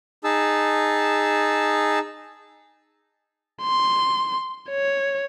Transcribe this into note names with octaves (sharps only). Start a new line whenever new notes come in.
D#4 G#4 A5 E6
C6
C#5